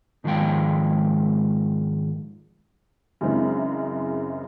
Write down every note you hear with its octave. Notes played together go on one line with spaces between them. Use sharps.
G#2 D#3 F3 G#3 F5 G5
F#2 C#3 E3 G#3 C4 D4